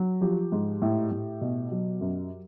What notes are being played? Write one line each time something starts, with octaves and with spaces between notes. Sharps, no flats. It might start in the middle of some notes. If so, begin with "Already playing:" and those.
Already playing: F#3
F3 G4
G#2
A2
A2
B2
F#3
F#2